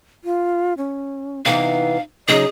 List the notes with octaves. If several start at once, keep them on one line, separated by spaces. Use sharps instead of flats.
F4
C#4
C3 E3 B3 D#4 F5
C#3 F#3 D#4 G#4 D#5